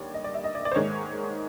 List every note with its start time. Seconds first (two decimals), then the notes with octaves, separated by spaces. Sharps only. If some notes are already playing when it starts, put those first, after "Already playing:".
Already playing: D#2 D3 G3 C#5 D5
0.14 D#5
0.24 D5
0.34 E5
0.44 D#5
0.55 D5
0.65 D5
0.72 C5
0.75 G#2 D#3 G#3 C#5